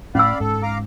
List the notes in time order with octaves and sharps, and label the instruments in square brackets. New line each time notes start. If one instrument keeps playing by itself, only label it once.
[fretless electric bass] A2 [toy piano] C#4 E6 [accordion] D5 F5 B5
[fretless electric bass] G#2 [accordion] A4
[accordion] F5 A#5 D6